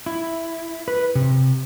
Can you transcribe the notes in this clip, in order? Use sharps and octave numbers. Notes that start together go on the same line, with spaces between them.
E4
B4
C3